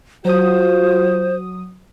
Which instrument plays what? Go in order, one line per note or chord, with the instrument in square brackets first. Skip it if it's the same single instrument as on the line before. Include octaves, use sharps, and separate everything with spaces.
[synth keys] F#3 D#6 [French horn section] F4 F#4 [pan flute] C5